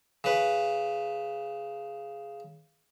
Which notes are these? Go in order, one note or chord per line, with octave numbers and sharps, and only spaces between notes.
C#3 B4